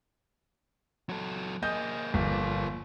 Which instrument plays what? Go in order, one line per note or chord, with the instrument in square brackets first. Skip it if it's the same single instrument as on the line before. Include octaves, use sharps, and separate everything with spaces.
[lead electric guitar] F#3 A4
[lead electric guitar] A#3 G#4 [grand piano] D#5 G6
[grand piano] G1 [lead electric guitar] F3 A#3